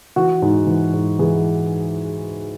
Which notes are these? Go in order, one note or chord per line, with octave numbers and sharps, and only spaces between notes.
E3 F#4
G#2
E3
G#2
E3 G#4